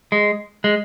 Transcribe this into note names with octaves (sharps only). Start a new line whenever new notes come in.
G#3
G#3